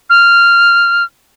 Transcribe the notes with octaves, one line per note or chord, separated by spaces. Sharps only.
F6